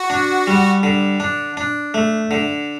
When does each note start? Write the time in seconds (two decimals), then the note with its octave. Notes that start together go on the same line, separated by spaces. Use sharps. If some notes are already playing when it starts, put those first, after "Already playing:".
Already playing: F#4
0.10 D4
0.47 G3
0.83 D3
1.20 D4
1.57 D4
1.94 A3
2.31 D3